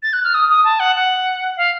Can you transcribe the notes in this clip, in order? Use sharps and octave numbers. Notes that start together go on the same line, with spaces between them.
A6
F#6
F6
D#6
D#6
A5
F#5
F#5
F5